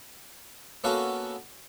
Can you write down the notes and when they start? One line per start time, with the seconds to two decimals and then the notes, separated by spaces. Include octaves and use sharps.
0.84 A#3 B3 C#4 F#4 A4 F5